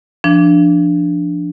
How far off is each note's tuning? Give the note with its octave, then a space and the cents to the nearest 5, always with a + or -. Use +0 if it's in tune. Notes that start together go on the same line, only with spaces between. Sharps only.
F3 -25 D4 +0